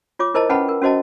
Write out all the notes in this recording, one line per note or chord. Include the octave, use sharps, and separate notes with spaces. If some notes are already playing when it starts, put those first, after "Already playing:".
F4 C#5 D6
E4 A#4 C5 D#5 A5
C#4 B4 F#5 G5 A5 B5
A#4
C#4 F#4 C5 D#5 A5